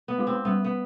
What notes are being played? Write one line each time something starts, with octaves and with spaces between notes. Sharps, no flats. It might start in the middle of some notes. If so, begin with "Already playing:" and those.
B3
G#3 D4 F4
C4
G3 B3
B3